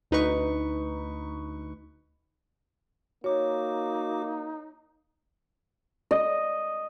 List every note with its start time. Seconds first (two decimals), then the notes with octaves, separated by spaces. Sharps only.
0.11 D2 D#4 B4 C#6
3.24 A#3 D#4 F#4 C#5 D6
6.11 D#5